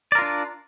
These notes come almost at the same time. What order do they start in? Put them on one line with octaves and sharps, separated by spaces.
D5 A#4 F4 D4